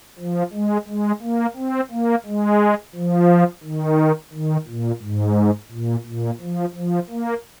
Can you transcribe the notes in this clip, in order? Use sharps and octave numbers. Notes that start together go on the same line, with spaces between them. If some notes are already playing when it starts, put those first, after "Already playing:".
F3
G#3
G#3
A#3
C4
A#3
G#3
F3
D#3
D#3
A#2
G#2
A#2
A#2
F3
F3
A#3